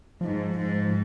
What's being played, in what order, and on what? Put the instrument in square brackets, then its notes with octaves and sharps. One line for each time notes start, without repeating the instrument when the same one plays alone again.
[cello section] G#2 [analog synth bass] F3
[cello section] G#2